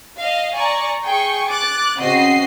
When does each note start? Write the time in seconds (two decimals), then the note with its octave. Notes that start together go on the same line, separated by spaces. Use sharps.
0.19 D#5 F5
0.55 D5 G#5 A#5 C#6
1.03 G#4 G5 C#6
1.51 D6 F#6 A6
2.00 C#3 C4 F#4 D#5 C7